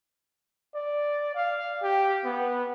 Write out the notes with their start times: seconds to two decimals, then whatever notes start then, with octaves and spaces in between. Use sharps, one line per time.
0.75 D5
1.35 F5
1.82 G4
2.24 B3